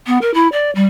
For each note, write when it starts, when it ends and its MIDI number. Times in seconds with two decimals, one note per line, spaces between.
0.07 0.18 59
0.21 0.33 70
0.34 0.48 64
0.52 0.70 74
0.75 0.86 55